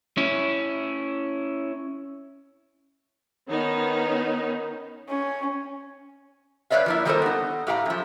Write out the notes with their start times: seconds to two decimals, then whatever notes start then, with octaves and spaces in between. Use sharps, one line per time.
0.17 C#4 E4
3.49 D#3 B3 C#4 D#4
5.08 C#4
6.70 G2 B4 C#5 D5 E5 F5
6.86 F3 A#3 E4
7.05 D#3 G3 A#3 F4 A4 C5
7.22 B3 D#4
7.67 A2 G4 F5 F#5 A#5
7.86 F#2 F3